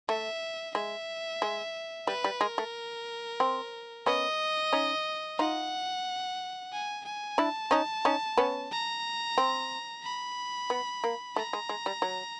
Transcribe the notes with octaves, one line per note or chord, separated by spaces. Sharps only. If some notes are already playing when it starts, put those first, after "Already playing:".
A3 E5
G#3 E5
G#3
G3 B4
G3
G#3 A#4
A3
C4
B3 C#4 D#5
C#4 D#4
D#4 F4 F#5
G#5
G#5
D4 E4 A5
C#4 D#4
C#4 D#4
B3 C#4
A#5
C4
B5
B3
A#3
A3 A#5
G#3
G#3
G3
F#3